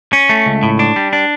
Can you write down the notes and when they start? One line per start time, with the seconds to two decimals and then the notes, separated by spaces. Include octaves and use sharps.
0.13 C#4
0.29 A3
0.46 C#2
0.63 A2
0.79 D4
0.96 G3
1.13 D4